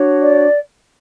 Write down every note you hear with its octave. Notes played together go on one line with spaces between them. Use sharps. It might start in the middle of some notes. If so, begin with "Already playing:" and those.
Already playing: D4 F#4 C#5
D5